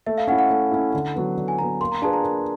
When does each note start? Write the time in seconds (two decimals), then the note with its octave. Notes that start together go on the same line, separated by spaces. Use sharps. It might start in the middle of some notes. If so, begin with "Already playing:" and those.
0.07 A3 E5
0.18 F5
0.27 C#4 F#5
0.32 E4
0.39 F#5
0.50 A3
0.72 C#4 E4
0.94 D3
1.16 F#3 B3
1.37 D3
1.48 G#5
1.58 F#3 B3 A#5
1.81 A#3 C6
1.92 A#5
2.02 D4 F4 G#4 B4 A5
2.13 A#5
2.24 A#3